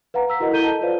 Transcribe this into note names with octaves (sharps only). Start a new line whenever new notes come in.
B4 F5 F#5 A#5
A#5 E6 B6
E4 F#4 A#4 D#5 F#5
E4 A4 A#5 G6 D#7 G7
D#5 A5
F4 B4 C5 D5 F5